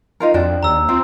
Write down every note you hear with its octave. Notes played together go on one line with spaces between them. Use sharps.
D#4 F4 A#4
F2 D4 F#4 G5
D#2 A#5 E6
C4 F4